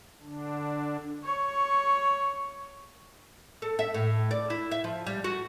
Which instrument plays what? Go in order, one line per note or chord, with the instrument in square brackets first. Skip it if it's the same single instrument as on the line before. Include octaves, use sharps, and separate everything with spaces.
[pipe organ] D3 D4
[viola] C#5 C#6
[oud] A4
E5
A2
D5
E4
E5
F3
G3
F#4